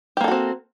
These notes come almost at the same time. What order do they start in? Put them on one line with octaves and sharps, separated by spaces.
G4 A#3 A4 F#4 C4